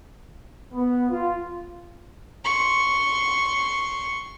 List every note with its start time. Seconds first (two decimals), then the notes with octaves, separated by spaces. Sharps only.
0.73 B3
1.10 F4
2.44 C6 C#6